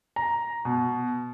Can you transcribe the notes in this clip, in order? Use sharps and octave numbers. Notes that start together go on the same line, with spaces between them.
A#5
B2